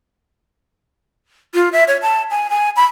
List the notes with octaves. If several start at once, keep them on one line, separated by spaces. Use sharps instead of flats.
F4
E5
C#5
A5
G#5
G#5
B5